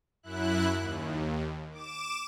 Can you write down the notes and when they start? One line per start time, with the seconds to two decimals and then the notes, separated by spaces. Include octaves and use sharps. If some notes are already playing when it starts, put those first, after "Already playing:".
0.23 F#2 E4 F#6
0.77 D#2
1.72 D6 E7